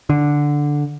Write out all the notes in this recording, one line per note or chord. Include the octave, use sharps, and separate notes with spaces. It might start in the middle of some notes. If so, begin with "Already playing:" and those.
D3